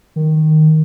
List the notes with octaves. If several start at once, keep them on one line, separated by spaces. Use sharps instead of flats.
D#3